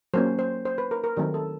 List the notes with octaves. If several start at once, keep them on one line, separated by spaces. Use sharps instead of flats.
F#3 A#3 C#4 C5
C5
C5
B4
A#4
A#4
D#3 F#3 A3 C4 A#4
A4